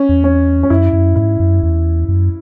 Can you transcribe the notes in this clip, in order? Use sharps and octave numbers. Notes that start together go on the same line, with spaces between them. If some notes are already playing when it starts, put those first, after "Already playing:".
Already playing: C#4
E2
C#4
C#4
F#2 E4
F#2
G#2 E4
F#2
E2
F#2